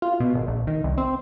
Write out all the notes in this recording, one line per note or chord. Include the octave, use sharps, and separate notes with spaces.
F4
B2
G#1
A#1
D#3
C2
C4